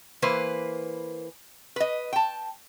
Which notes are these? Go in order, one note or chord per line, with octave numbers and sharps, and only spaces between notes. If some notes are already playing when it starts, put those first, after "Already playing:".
E3 A#3 B4 C5
B4 D#5
G5 A5